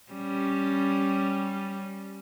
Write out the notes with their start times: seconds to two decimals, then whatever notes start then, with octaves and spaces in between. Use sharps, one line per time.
0.12 G3 C#4